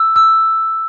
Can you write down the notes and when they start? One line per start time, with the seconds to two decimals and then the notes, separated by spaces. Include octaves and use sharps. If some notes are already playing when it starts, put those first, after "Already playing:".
Already playing: E6
0.16 E6